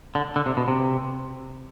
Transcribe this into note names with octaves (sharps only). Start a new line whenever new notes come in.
D3
D3
C3
B2
C3